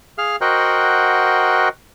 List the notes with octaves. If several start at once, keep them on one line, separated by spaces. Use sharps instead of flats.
G#4 F5 F6
F#4 A#4 C5 D#5 F#5 G5